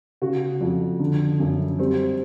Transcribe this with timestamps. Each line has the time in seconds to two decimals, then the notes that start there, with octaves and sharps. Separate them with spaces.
0.22 C#3 F#4
0.61 F2
1.00 D3
1.40 F#2
1.78 G3 C4